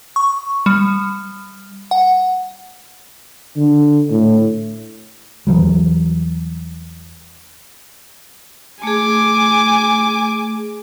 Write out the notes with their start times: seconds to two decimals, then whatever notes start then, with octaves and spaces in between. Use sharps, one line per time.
0.16 C#6
0.66 G3
1.91 F#5
3.56 D3
4.10 A2
5.47 E2 E3 F#3 G3
8.83 A3 G#4 G#5 D6